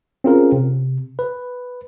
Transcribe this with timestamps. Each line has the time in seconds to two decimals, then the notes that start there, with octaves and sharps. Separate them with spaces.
0.24 C4 C#4 F4 G#4 A#4
0.52 C3
1.19 B4